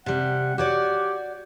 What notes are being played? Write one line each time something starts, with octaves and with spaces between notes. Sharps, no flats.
C3 G3 F#5
F#4 G4 C#5 D5